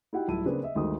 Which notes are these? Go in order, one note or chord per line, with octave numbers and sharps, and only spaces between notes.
D#4 E4 F#4 G4 F#5 G5
D1 F3 G3 E4 A5 D#7
C#3 A#3 C4 D4 G#4 B4
D#5 E5
G1 D2 D#3 G#3 D#4 D#6